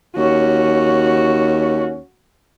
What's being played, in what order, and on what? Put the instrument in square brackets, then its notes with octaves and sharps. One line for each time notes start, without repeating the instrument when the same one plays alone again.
[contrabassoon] D#2 [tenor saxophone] C#4 [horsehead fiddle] F#4